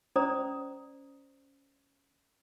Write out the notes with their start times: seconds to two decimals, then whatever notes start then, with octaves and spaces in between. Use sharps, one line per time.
0.16 C#4 C5 D5 A#5 D#6